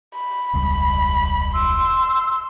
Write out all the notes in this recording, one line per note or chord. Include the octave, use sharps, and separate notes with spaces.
B5
E1 C#2 G2
C6 E6